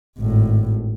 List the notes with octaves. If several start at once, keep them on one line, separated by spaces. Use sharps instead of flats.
G#1 A2